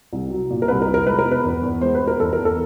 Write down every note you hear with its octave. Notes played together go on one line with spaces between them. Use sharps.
C2
F#3
A#2
A#4
C2 B4
A#4
C2
A#4
G#3 B4
A#4
B2
B4
E2
E2
G#3 C5
B4
B2
A#4
E2 A4
A#4
E2
A4